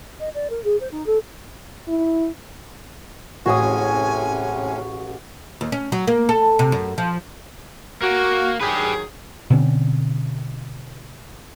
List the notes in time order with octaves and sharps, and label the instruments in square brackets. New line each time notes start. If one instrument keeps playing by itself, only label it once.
[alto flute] D#5
D5
A#4
G#4
C5
D#4
A4
[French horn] E4
[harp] A1 G#4 [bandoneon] A2 C3 C#4 [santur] F#4 D#6 [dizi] G#5
[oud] D#2
C#4
F#3
A#3
A4
C3
F#2
F3
[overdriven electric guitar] A#3 [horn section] F#4
[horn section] D#3 F#3 G#4 [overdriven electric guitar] G4 B4
[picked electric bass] B2 D3 C4 C#4